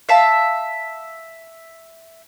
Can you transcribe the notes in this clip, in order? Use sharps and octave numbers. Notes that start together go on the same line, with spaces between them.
E5 F5 A5